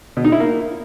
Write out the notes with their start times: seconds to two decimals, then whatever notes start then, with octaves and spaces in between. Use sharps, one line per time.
0.17 B2
0.24 D#4
0.32 E4
0.40 A#3